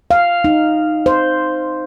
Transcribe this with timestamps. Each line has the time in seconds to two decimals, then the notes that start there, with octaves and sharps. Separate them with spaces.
0.11 F5
0.44 D#4
1.06 C5